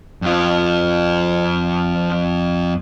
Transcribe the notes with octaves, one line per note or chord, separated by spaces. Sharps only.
F2 F4